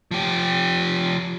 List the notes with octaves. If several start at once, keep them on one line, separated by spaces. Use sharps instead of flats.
F3 G4